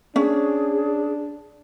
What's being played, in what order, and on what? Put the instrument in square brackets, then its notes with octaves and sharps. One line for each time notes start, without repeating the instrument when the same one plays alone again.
[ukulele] C#4 [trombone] D4 [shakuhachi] G#4